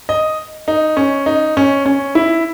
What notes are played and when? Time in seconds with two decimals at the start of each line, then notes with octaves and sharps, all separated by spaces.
0.09 D#5
0.68 D#4
0.97 C#4
1.26 D#4
1.57 C#4
1.86 C#4
2.15 E4